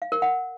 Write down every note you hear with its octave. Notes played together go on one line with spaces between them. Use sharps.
F5
A#4
F#5